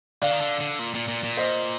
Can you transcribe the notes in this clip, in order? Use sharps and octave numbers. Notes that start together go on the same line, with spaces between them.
D3 D5 F5
D#3
D3
D3
A#2
A#2
A#2
A#2
C5 D#5